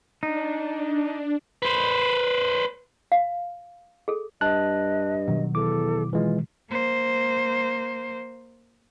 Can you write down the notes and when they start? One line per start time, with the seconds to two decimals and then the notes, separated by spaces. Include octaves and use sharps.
0.23 D4 D#4
1.62 B4 C5
3.12 F5
4.08 G#4 A4
4.41 G2 D#5 A5 F#6
5.28 B2 D#3 F#3
5.55 E2 A4 D6
6.13 E3 G#3 F4
6.70 A#3 C5